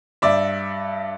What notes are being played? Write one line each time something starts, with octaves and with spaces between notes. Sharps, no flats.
G2 D5 E5